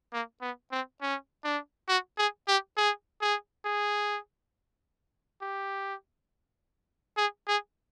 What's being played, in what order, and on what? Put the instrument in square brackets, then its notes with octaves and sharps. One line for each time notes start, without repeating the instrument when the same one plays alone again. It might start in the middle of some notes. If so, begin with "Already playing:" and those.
[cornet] A#3
B3
C4
C#4
D4
F#4
G#4
G4
G#4
G#4
G#4
G4
G#4
G#4